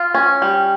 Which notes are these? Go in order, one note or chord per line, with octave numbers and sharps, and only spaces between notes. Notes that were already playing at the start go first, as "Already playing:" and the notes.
Already playing: F4
C#4
G3